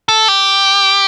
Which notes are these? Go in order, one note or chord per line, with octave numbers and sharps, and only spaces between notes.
A4
G4